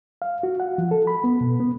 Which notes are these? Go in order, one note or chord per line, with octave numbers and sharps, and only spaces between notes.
F5
F#4
F#5
F3
A4
B5
B3
B2
B3